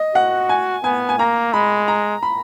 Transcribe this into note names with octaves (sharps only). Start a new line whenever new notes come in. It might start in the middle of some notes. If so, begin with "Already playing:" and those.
Already playing: D#5
F#4 F#5
G#5
B3 G#5
G#5
A#3 A#5
G#3 B5
A#5
B5